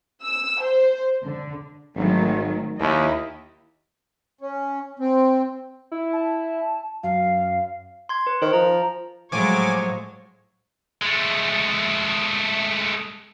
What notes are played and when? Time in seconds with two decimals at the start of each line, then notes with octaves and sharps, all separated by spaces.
0.23 E6
0.62 C5
1.24 D3
1.95 G#1 D#3 F#3 A3
2.80 D#2 E4 D#5
4.41 C#4
4.99 C4
5.91 E4
6.13 A5
7.03 F#2 F5
8.09 C6 G#6
8.27 B4
8.42 D#3 C5
8.53 F3 A#5
9.32 A2 F3 F#3 G#3 C#5 G#5 D6
11.02 G#3 A3